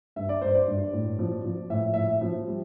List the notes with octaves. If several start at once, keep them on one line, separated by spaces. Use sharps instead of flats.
G2 E5
D5
G2 C5
D5
G2
A2
F3
F3
A2 E5
A2 E5
F3
G3